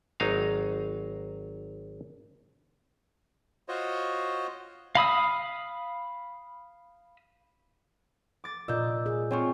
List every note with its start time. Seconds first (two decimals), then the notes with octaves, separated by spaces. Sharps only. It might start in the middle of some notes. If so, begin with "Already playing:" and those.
0.20 G#1 F#3 D#4 F5
3.68 F4 F#4 C5 C#5 D#5
4.95 F5 B5 D#6 E6
8.44 D6 A6
8.68 A#2 F4 D5 D#5 E6 G6
9.06 G#4
9.31 C4 F4 C#5 G#5 C#6